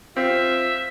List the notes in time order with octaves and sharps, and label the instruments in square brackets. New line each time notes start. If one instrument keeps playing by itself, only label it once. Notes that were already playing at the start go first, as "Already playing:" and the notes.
[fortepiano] C4 [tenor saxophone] F4 [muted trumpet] E5